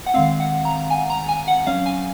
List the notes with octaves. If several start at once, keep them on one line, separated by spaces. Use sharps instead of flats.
F#5
D#3 G#3 C4 F5
F#5
A#5
G#5
A#5
G#5
F#5
F#3 C#4 F5
G#5